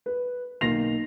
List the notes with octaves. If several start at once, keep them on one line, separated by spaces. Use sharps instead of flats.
B4
B1 A#3 A#6 C7 F7